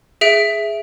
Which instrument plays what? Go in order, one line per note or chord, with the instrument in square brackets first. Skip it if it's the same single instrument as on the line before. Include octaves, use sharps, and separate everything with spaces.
[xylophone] G#4 E5 D7